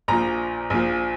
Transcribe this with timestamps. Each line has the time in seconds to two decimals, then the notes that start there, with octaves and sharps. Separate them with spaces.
0.08 A#1 A#2 F3 A#5
0.70 A#1 A#2 F3